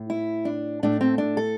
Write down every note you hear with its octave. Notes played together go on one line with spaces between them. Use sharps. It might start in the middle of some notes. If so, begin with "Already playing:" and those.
Already playing: A2
E4
D4
A2 A3 D4
C4
D4
A4